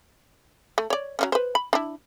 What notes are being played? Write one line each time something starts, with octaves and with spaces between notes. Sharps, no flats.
A3
C#5 D5
F#3 B3 C#4
B4 C5
B5
D4 E4